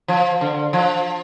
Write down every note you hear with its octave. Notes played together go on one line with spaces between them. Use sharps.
F3
D3
F3